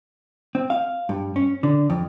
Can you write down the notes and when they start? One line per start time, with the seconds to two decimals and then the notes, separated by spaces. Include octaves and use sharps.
0.55 C4
0.70 F5
1.09 G2
1.36 C#4
1.63 D3
1.90 F2